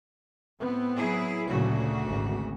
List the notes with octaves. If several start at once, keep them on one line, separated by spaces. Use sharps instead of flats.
A2 B3 C4
F#3 E4 G#4
D2 A#2 C#3 F#3 F#4
G#1 C#3